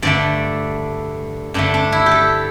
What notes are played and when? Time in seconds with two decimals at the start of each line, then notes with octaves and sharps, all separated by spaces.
0.02 G2 D3 A3 D5
1.54 G2 D3 A3 D4
1.74 D4
1.92 E4
2.06 G4
2.11 A4